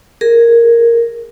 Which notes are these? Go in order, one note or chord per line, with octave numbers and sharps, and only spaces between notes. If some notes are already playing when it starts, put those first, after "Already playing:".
G#4 A#4